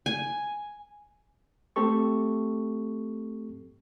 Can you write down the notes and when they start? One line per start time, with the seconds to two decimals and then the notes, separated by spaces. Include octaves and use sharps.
0.06 G#5
1.76 A3 C4 G4 A4 C#6